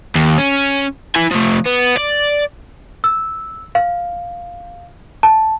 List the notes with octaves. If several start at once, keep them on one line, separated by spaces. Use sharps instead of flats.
D#2
C#4
E4 G#5
F3 A3
B3
D5
E6
F5
A5